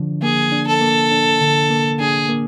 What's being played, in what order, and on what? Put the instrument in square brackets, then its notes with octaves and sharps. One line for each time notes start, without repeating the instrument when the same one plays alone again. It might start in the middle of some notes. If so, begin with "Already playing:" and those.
Already playing: [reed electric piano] D3 F3 D4
[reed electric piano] A#3 [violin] G#4
[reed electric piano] D4
[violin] A4
[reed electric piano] A#3
D4
D3
A#3
[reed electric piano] D4 [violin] G#4
[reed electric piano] A#3